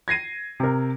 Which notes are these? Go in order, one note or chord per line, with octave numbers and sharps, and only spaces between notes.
G#6 A#6 C7 D#7
C3 A#4